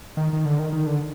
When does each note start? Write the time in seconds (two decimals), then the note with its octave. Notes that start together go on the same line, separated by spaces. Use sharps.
0.17 D#3
0.33 D#3
0.45 D3
0.59 D#3
0.73 D#3
0.87 D3